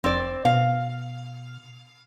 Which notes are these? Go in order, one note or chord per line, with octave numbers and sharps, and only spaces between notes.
F1 C4 D5
B2 F5